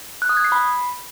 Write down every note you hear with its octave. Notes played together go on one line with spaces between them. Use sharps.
F#6
D#6
G#6
C7
B5